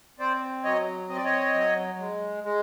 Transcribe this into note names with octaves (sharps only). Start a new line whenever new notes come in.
C4 C5 D5
F#3 C#5 D#5
C4 D#5
D5
C#5 D#5
F#3
G#3
G#3